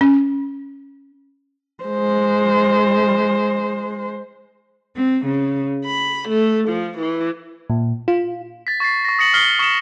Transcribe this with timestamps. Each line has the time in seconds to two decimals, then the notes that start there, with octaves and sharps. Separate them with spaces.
0.01 C#4
1.84 G#3 C5
4.97 C4
5.26 C#3
5.85 B5
6.28 A3
6.67 F3
6.97 E3
7.70 A#2
8.08 F4
8.67 A6 B6
8.80 C#6 A6 B6 C7
9.05 C#6 A#6
9.19 D#6 A#6 C#7 F#7
9.34 D#6 F6 B6 C7 G7
9.59 C#6 D#6 B6 C#7 E7 F#7